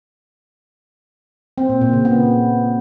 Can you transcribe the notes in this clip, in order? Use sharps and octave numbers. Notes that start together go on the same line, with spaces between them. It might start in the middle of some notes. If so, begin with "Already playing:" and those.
C4
A#2
A#2
C#3
B3